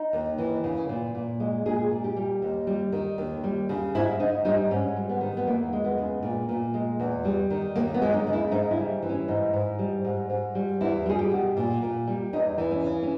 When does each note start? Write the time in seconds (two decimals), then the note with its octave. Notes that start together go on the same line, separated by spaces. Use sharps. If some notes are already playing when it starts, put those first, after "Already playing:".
Already playing: D#4
0.13 D#2
0.38 E3
0.64 C#3
0.89 A#2
1.15 A#2
1.40 G#3
1.66 A#2 G#4
1.91 A#2
2.04 G4
2.16 G3
2.42 D#2
2.67 G3
2.92 D#3
3.18 D#2
3.44 G3
3.69 C#3
3.95 G#2 E4
4.20 G#2 D#4
4.45 G3 D#4
4.71 G#2 C#4
4.96 G3
5.09 B3
5.21 D#3
5.37 B3
5.47 E2 A#3
5.73 G#3
5.85 B3
5.98 C#3
6.23 A#2
6.49 A#2
6.74 G#3
7.00 E2
7.25 G3
7.50 D#3
7.75 D#2 A#3
7.94 B3
8.02 G#3
8.14 D#4
8.27 C#3
8.33 E4
8.51 G#2 D#4
8.71 E4
8.77 G3
9.03 E3
9.09 C#4
9.28 G#2 D#4
9.53 G#2
9.79 G3
10.05 G#2
10.30 G#2
10.55 G3
10.81 E2 E4
11.06 G3 G#4
11.19 G4
11.32 B2
11.57 A#2
11.82 A#2
12.07 G3
12.33 E2 D#4
12.58 E3
12.71 C#4
12.84 C#3
13.02 C#4